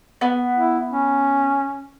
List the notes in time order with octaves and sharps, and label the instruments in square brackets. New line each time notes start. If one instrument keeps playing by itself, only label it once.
[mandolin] B3
[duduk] E4
C#4